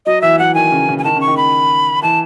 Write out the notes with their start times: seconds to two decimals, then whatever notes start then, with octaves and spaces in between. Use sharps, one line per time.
0.06 F#3 D#5
0.22 E3 E5
0.39 F#3 F#5
0.55 D#3 G#5
0.72 C#3
0.89 C#3
0.98 G#5
1.04 D#3 A5
1.16 C#3 C#6
1.28 D#3
1.37 B5
2.02 E3 A5